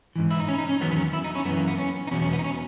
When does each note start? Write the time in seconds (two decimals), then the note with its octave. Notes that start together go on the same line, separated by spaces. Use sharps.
0.16 G#2 E3
0.31 E4
0.40 D#4
0.48 C#4
0.59 D#4
0.69 C#4
0.80 E2 D#3 F#3 B3
0.91 B3
0.97 C#4
1.13 E4
1.24 D#4
1.35 C#4
1.45 F#2 B3
1.49 E3
1.57 A#3
1.68 B3
1.79 C#4
2.07 D#4
2.11 E2 B2 F#3 C#4
2.22 C#4
2.33 B3
2.39 D#4
2.44 C#4